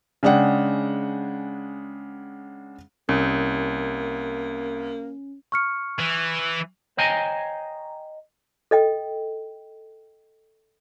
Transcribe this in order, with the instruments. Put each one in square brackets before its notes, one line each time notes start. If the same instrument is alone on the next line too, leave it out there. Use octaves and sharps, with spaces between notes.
[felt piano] C#3 G#3 D4 G#4 F#5 G5
[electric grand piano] C2 [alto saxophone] A#3 [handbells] C#4
[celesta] C#6 F6 C#7
[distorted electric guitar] E3
[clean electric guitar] C5 C#5 D#5 G5 G#5 A#5
[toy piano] A4 D#5 G5